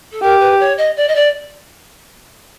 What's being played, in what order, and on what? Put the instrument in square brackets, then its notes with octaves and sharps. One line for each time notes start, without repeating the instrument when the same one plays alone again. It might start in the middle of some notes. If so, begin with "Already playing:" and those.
[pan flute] A4
[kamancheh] G4 [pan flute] A#4
[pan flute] B4
C#5
D#5
D5
D#5
D5